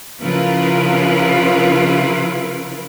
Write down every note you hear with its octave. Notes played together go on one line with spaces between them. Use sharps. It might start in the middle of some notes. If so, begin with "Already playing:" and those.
C#3 F3 E4 F4 A#4 B4